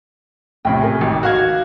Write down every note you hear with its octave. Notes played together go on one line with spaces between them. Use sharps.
A#1 A2 C3 G5 B5
A#4 E5 G#5
G#1
F#4 D#5 F5 G#6